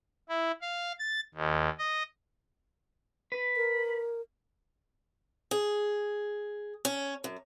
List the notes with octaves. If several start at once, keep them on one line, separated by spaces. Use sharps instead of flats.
E4
F5
A6
D#2
D#5
B4
A#4
G#4
C#4
F#2